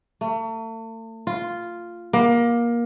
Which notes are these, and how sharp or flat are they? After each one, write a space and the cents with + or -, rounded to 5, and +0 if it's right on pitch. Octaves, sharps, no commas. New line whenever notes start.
A3 +40
F4 -5
A#3 +20